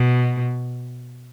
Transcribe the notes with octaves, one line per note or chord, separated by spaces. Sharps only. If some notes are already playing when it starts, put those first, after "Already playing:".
Already playing: B2